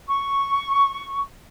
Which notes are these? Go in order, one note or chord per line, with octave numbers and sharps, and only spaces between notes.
C#6